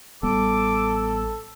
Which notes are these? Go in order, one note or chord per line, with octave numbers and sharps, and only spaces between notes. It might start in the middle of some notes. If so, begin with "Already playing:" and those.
A1 G3 B3 A4 D6